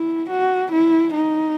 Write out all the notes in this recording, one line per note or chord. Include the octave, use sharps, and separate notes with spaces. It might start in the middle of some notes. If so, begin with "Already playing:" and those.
Already playing: E4
F#4
E4
D#4